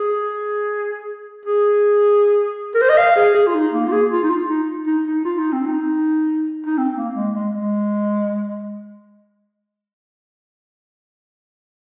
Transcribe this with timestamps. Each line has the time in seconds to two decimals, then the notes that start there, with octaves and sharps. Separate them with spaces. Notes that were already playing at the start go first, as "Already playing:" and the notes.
Already playing: G#4
1.45 G#4
2.75 A#4
2.81 C5
2.89 D#5
2.98 F5
3.16 G#4
3.35 G#4
3.47 F4
3.54 D#4
3.73 A#3
3.88 F4
3.92 G#4
4.11 F4
4.23 D#4
4.30 F4
4.49 D#4
4.87 D#4
5.07 D#4
5.25 F4
5.39 D#4
5.52 C4
5.66 D#4
6.66 D#4
6.78 C4
6.97 A#3
7.16 G#3
7.34 G#3
7.52 G#3